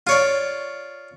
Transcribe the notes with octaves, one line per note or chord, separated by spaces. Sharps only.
F4 C#5 D5